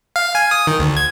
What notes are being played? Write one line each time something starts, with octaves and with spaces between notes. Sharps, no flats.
F5
G#5
D#6
D#3
D2
G#6